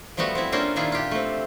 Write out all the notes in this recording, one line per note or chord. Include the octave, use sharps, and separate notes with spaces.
F3 G3 A3 B3 F#4
C4 E4
A#3 C#4 D4 F4 A#4 C5
A#2 D#3 D4 E4 F4 G#4
F4 G4
A3 C4